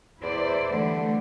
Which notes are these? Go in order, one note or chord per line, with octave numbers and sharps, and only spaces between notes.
E2 E4 C5 D5
D3 E3 G3 A3